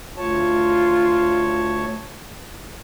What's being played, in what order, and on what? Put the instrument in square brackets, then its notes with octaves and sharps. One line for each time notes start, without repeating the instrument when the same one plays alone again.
[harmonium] D2 C#5 A5 [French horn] F4